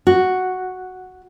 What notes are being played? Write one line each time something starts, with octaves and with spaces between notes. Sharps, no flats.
F#4